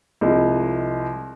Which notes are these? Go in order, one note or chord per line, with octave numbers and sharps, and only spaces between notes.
C2 F3 G#3